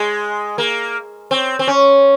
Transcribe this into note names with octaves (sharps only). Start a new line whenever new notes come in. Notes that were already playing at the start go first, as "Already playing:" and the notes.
Already playing: G#3
A#3
C4
C4
C#4